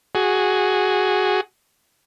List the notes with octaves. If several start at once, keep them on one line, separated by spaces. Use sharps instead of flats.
F#4 G#4